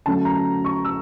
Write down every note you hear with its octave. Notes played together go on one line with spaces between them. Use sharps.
D3 F#3 A3 C#4 A5
A#5
C#6
E6